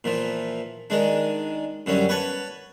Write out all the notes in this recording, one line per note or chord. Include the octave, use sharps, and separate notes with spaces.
A#2 E3 F3
D#3 G#3 D4
F#2 D3 G3 C#4
B4 C#5 F#5 A5